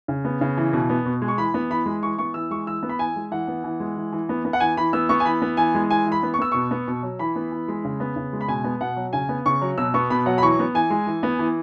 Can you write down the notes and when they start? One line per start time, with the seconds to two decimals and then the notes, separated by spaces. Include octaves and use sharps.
0.08 C#3
0.25 B3
0.41 C#3
0.57 E3
0.73 B2
0.89 B3
1.05 B2
1.22 G#3
1.28 C#6
1.38 E3 B5
1.54 B3
1.70 E3 B5
1.86 G#3
2.03 E3 C#6
2.18 B3 C#6
2.34 E3 E6
2.51 G#3 C#6
2.67 E3 E6
2.83 B3
2.89 B5
2.99 E3 G#5
3.16 G#3
3.31 E3 F#5
3.48 B3
3.64 E3
3.80 G#3
3.97 E3
4.12 E3
4.29 B3
4.45 B3
4.53 F#5
4.60 E3 G#5
4.77 E3 B5
4.93 B3 E6
5.09 B3 C#6
5.20 G#5
5.25 E3 B5
5.42 B3
5.57 E3 G#5
5.75 G#3
5.90 E3 G#5
6.06 E3
6.12 B5
6.23 B3
6.34 C#6
6.39 B3 E6
6.52 B2 C#6
6.71 B3
6.88 B2
7.03 F#3
7.19 E3 B5
7.36 B3
7.52 E3
7.68 G#3
7.85 C#3
8.00 B3
8.16 C#3
8.33 G#3
8.41 B5
8.48 B2 G#5
8.64 B3
8.81 B2 F#5
8.97 F#3
9.13 C#3 G#5
9.29 B3
9.46 C#3 C#6
9.61 F#3
9.78 B2 E6
9.94 B3 C#6
10.10 B2 B5
10.26 F#3 F#5
10.38 B5
10.42 E3 C#6
10.59 B3
10.75 E3 G#5
10.90 G#3
11.07 E3
11.23 B3
11.39 E3